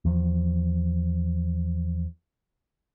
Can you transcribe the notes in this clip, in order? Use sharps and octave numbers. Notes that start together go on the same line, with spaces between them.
E2 F3